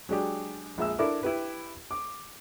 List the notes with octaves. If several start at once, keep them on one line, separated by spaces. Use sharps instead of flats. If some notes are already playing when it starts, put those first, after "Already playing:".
F#3 G#3 D4 G4
A#1 G#3 E5 E6
D4 E4 A4 A#4 E5 D6
E4 G4 B4
D6